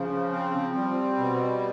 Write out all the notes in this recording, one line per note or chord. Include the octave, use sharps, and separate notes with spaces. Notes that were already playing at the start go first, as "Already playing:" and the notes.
Already playing: C#3 F3
C4
G3
B2